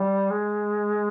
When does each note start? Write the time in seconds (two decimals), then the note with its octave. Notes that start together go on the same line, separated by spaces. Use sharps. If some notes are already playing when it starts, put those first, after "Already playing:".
Already playing: G3
0.30 G#3